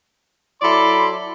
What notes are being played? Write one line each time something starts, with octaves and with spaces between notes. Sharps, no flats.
F#3 E4 A4 D5 B5 C6